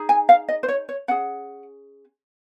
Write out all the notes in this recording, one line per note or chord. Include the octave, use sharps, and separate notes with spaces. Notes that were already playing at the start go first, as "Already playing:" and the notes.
Already playing: D#4 G#4
G#5
F5
D#5
C5
C#5
C#5
C#4 G#4 F#5